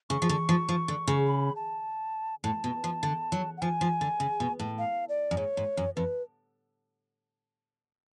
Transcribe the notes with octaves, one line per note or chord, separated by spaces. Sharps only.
C#3 C#6
F3
D3
F3
F3
D3
C#3
B5
A5
A2 A5
B2
F3
D3
F#3
F#5
F3 G#5
F3
D3
C#3
B2
A2
F5
D5
F#2
G#2 C#5
G#2
F#2
F2 B4